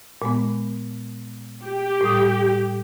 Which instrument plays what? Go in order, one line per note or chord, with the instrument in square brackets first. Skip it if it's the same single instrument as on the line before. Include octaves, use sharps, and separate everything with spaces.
[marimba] A#2 G#3 B3
[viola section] G4
[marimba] A2 G3 D#6